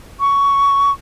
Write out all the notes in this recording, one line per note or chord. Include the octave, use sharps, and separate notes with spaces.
C#6